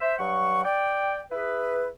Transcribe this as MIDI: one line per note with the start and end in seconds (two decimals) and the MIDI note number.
0.01 0.14 72
0.01 0.14 76
0.19 0.63 43
0.19 0.63 54
0.19 0.63 78
0.19 0.63 85
0.64 1.21 74
0.64 1.21 79
1.31 1.88 64
1.31 1.88 68
1.31 1.88 71